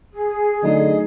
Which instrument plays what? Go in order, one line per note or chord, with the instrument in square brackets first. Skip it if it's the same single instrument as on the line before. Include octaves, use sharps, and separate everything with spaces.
[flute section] G#4
[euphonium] D3 [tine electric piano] F#3 A3 D#4 [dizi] D#5